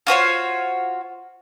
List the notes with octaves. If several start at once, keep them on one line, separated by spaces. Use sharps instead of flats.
F4 F#4 C5 C#5